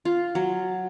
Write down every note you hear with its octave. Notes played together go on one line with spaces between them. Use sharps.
F4
F#3